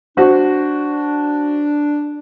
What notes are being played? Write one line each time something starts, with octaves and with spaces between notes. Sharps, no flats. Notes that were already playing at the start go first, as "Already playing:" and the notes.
D4 F#4 C5